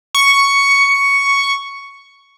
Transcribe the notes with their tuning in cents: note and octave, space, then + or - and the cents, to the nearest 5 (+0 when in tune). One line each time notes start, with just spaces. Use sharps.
C#6 +5